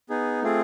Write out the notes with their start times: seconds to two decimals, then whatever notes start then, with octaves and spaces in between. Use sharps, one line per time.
0.10 B3 D#4 G#4
0.42 A3 C4 F4 G#4